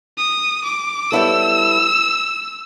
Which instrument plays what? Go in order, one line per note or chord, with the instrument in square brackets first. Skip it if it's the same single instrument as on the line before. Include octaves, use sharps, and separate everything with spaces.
[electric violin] D#6
D6
[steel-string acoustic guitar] G3 B3 E4 A4 C#5 [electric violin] E6